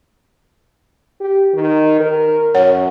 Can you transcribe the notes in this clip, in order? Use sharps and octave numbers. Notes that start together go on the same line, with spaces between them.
G4
D#3
A#4
F#2 C#5 F#5